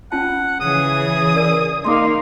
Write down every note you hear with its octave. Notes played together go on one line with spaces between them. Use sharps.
C#4 F4 F#5 A5
C#3 E3 G#4 D#6
A#4 D5 E6
A#3 D#4 F5 C6 D6